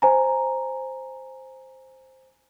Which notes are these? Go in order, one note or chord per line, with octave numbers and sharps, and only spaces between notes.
C5 G#5 A#5